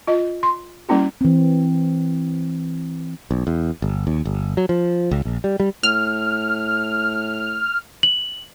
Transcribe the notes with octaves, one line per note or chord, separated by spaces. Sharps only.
F4 D#5
C6
G3 A#3 C#4 E4 F#4
E3 C4
B1
E2
G1
D#2
G1
F#3
F3
C#2
A#1
G3
G3
A2 F6
F#7